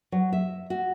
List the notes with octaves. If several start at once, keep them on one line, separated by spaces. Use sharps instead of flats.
F#3
E5
F#4